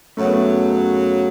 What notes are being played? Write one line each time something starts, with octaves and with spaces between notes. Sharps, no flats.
F#2 C#3 F#3 A3
B3
A3